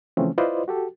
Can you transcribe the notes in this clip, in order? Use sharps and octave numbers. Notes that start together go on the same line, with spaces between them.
C#3 E3 F3 A3 C4 C#4
E4 F4 B4 C5 D5 D#5
F#4 G4 A4